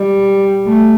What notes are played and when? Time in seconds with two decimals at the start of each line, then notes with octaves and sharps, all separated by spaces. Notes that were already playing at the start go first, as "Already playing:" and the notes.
Already playing: G3
0.67 A3